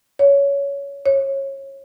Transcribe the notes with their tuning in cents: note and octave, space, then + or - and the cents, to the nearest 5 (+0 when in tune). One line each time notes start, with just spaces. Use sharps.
C#5 +15
C#5 -25